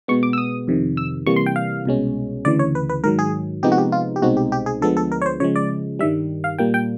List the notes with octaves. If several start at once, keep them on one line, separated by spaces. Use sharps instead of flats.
B2 G#3 B3 C#6
D6
E6
D#6
F2 C3 D#3
E6
C3 E3 G3 A#3 C#6
C6
G5
F5
C2 B2 G#3 C#4
D2 C#3 E3 D5
C#5
B4
B4
G#2 D#3 F#3 A#4
G#4
C3 F3 G#3 B3 D#4 G4
F#4
G4
F4
G4
C2 B2 G#3 C4 D#4 F#4
G4
G4
G#4
D2 D3 F3 G#3 B3 A4
A4
A#4
C#5
C5
C#3 F3 G#3 C#5
D5
G2 D#3 G3 E5
F5
A#2 G3 A#3 G5
G5